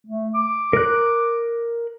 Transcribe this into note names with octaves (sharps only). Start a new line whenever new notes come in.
A3
D6
A#4 F#6